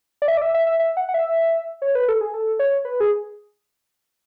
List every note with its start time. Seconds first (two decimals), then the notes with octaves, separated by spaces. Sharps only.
0.22 D5
0.28 E5
0.37 D5
0.42 E5
0.54 E5
0.67 E5
0.80 E5
0.97 F#5
1.09 F#5
1.14 E5
1.82 C#5
1.95 B4
2.08 A4
2.21 G#4
2.34 A4
2.59 C#5
2.85 B4
3.00 G#4